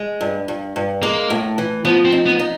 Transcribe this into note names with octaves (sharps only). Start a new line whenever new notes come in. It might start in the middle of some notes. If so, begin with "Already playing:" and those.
Already playing: G#3
G2
G2
G2
G#3 A#3
A2
E3
F3 B3
C4
D#4
B3
D#4